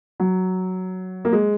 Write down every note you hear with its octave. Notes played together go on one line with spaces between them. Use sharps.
F#3
A#3
G#3